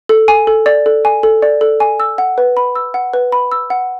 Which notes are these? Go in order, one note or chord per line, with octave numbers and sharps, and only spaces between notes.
A4
G#5
A4
D5
A4
G#5
A4
D5
A4
G#5
E6
F#5
B4
B5
E6
F#5
B4
B5
E6
F#5